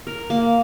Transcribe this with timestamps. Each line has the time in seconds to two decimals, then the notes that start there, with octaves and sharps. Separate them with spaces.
0.07 A#4
0.30 A#3